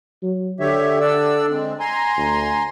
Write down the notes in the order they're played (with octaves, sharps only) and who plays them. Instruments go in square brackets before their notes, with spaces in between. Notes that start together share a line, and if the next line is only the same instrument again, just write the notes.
[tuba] F#3
[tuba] D3 [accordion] G4 C#5 E5
[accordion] D4 D5 E6
G#3 C4
G#5 A#5 C6
[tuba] D2